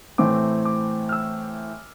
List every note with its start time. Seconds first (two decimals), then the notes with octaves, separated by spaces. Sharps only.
0.18 A2 E3 A3 C4 D6
0.65 D6
1.09 F6
1.12 E6